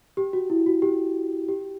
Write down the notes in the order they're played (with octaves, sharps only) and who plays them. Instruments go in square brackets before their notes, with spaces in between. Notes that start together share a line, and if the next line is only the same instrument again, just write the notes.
[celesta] G4
F#4
E4
F#4
G4
G4